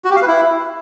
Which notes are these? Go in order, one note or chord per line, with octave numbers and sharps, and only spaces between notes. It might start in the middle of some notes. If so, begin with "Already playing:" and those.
F#4
G4
F5
B4
E4